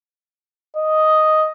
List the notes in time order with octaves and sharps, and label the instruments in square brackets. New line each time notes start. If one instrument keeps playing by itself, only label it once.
[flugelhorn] D#5